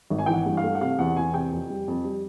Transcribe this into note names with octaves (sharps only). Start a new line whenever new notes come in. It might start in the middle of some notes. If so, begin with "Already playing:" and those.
G#1
G#5
E3 G5
F#5
G2
F5
A3
F#5
C3 F5
E2 F#5
E2 G#5
C3 G5
F2
G3
F2
G3